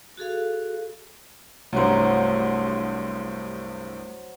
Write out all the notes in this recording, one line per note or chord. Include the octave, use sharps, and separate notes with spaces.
F#4 G#4 A4 F5
C2 G2 F#3 A3 C5 F#5